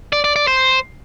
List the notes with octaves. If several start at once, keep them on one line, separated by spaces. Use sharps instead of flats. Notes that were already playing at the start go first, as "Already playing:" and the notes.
D5
D5
D5
C5